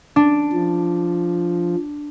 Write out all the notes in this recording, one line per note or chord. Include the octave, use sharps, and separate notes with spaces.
D4
F3